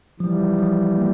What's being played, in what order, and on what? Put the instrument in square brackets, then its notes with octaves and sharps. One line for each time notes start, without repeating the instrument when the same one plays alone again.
[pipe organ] E3 G3 [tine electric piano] F3
[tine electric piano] F3
A#3